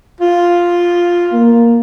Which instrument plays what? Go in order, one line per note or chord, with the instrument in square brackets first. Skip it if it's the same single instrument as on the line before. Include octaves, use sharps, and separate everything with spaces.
[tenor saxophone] F4
[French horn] A#3